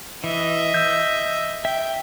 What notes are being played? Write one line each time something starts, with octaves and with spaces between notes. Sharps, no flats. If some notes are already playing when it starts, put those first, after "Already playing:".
E3 D#5 E5
E6 G6
E5 G5